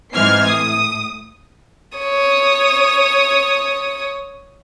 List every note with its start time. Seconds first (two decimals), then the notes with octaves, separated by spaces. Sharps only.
0.13 G#2 E3 C4 F6 G#6 C7
0.46 A2 D#6
1.98 C#5 D#6